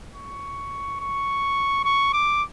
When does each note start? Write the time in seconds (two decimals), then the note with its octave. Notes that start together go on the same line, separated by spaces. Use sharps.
0.14 C#6
1.00 C#6
1.85 C#6
2.13 D6